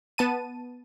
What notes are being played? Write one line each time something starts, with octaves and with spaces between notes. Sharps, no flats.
B3 A5 D#7